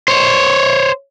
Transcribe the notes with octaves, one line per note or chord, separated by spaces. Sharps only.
C5 C#5